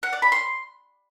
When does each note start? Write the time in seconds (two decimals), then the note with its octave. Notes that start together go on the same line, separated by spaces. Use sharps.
0.03 F#5
0.13 D5
0.22 B5
0.32 C6